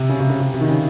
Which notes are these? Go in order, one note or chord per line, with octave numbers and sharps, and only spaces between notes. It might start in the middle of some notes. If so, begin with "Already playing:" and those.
Already playing: C3
C#3
C3
C#3
C3
C3
D#3
C#3